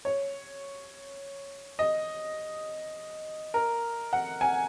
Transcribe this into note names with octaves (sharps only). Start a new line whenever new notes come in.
C#5
D#5
A#4
F#5
G#5